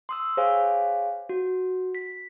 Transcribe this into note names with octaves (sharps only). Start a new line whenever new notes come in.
C6 D#6 E6
G#4 C5 C#5 F5 G#5
F#4
B6